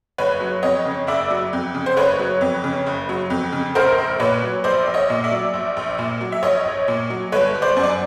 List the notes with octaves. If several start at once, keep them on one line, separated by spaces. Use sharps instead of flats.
F#1 B4 C#5
F#3
F2 C#5 D#5
C#3
F#1 D5 E5
F#3
F2
C#3
C5
F#1 B4 C#5
F#3
F2
C#3
F#1
F#3
F2
C#3
A#1 A#4 C5
A#1
A#2 B4 C#5
F#3
A#1 C5 D5
A#1
C#5 D#5
A#2
D5 E5
F#3
A#1
A#1
A#2
F#3
E5
A#1 C#5 D#5
A#1
A#2
F#3
G1 B4 C#5
G1
C5 D5
F#2
D5